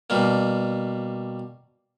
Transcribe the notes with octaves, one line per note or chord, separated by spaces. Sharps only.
B2 G3 A#3